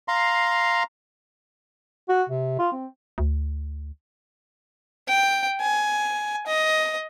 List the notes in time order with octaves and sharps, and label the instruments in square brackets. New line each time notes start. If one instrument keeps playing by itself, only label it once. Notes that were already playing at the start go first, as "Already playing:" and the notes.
[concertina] F5 A#5 C6
[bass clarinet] F#4
C3
F4
C4
[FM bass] D2
[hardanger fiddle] G5
G#5
D#5